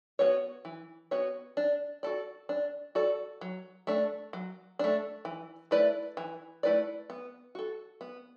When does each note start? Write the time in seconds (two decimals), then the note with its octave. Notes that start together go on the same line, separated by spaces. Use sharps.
0.19 B3 F#4 C#5
0.65 E3
1.11 B3 F#4 C#5
1.57 D4
2.03 F#4 A4 D5
2.49 D4
2.95 F#4 A4 D5
3.41 F#3
3.87 A3 D4
4.33 F#3
4.79 A3 D4
5.25 E3
5.71 A3 E4 B4 D5
6.17 E3
6.63 A3 E4 B4 D5
7.10 B3
7.55 F#4 A4
8.01 B3